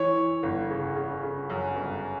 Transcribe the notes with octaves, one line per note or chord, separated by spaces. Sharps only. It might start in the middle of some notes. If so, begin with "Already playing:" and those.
Already playing: E3 C#5
E3
G1
C#3
C#3
C#3
F#2
G1